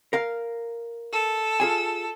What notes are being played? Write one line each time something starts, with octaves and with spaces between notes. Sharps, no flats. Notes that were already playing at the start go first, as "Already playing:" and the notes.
A#4 F5
A4
F4 G#4 G#5